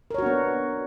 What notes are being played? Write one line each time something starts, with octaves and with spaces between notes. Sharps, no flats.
B3 D4 F#4 A#4 C#5